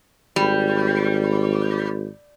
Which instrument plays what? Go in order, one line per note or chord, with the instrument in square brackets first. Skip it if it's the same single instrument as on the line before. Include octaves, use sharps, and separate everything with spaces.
[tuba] G#1 [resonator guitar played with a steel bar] G3